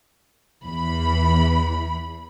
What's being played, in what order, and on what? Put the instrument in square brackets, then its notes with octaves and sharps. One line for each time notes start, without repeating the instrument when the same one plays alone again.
[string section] E2 E3 B5